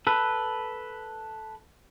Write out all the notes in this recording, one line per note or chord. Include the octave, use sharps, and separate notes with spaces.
A4 B4